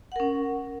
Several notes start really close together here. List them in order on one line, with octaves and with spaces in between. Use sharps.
F#5 A#4 C#4